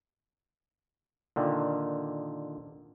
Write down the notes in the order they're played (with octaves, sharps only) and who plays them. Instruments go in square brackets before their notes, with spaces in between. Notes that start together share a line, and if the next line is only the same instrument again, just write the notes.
[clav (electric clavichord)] A#2 D3 D#3